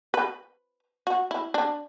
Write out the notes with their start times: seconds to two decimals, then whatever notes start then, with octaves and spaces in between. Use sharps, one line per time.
0.14 B4
1.07 F#4
1.31 E4
1.54 D4